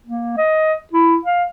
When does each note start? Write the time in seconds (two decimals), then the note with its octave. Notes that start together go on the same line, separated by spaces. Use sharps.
0.06 A#3
0.37 D#5
0.93 E4
1.25 F5